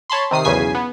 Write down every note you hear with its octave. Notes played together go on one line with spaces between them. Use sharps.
C#5 A5 B5 C6
C3 D#3 D#6 C7
B1 E2 C#3 G#5 B6 C7
B3